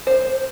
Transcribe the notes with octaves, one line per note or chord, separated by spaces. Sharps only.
C5